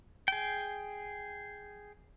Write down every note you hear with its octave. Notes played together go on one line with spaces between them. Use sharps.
G#4 G5